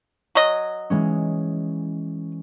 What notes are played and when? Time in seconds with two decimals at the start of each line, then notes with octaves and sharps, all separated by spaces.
0.35 F#3 D#5
0.90 E3 G#3 C#4